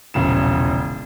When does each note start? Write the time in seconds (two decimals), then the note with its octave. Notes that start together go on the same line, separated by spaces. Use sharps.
0.14 E1 A#1 C#3 E7